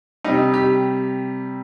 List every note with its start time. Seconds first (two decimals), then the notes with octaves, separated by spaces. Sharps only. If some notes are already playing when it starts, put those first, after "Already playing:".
0.24 C3 G3 D#4
0.54 G4